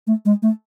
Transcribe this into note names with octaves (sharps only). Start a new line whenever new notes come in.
A3
G#3
A3